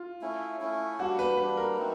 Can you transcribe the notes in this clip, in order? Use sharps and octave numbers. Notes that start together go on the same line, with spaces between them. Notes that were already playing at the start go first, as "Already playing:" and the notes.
Already playing: F4
A3 C#4 E4
A3 C#4 E4
G3 A#3 D4 F#4
B4
G3 A#3 D4 B4
A#4
F#3 A3 C4 D#4